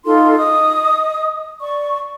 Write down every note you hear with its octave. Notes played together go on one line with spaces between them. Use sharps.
D#4 F4 A4 C6
D#5 D#6
D5 C#6